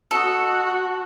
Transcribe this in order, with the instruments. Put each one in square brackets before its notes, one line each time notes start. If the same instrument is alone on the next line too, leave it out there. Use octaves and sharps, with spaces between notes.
[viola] F#4 [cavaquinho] A4 D#5